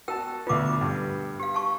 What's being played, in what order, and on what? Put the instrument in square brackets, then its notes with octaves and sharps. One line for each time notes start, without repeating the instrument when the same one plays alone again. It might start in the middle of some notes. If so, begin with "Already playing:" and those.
[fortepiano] F#4 A5 [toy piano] A#4 G5 E6
[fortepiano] D2 B3 [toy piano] F4 D6
[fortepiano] G2
[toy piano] G4 F5
F5 A5 C#6